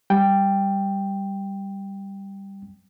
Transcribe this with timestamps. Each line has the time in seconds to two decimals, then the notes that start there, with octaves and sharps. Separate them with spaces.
0.10 G3 G5